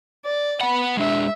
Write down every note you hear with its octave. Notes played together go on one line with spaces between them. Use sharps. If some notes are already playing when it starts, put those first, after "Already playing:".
D5
B3 F#5 B5
G#3 D4 E5